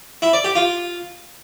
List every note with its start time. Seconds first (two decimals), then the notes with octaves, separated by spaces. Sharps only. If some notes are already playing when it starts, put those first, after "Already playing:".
0.22 E4
0.33 D5
0.44 G4
0.55 F4